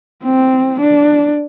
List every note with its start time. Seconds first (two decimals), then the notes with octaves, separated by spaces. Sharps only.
0.23 C4
0.80 D4